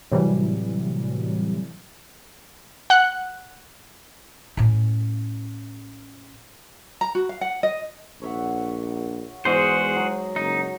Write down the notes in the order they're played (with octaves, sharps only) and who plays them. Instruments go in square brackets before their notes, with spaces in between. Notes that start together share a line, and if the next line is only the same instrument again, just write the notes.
[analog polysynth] A2 C3 E3 F#3 G3
[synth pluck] F#5 F#6
[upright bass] A2 C#4
[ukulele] A#5
F#4
F5
F#5
D#5
[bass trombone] A#1 [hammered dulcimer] C#5 E5 F#5
[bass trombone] E2 [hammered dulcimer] G#2 D#5 [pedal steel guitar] F#4 G#4 C5
[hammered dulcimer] F#3
[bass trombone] F#1 [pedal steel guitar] D#4